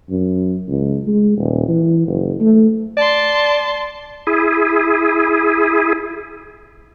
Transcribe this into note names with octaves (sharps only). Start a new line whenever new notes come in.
F#2
C#2
G#3
D#1
E3
F#1
A3
D5 A5 C6
E4 G#4